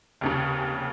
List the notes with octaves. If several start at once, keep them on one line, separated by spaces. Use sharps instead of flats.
F1 D#2 C#3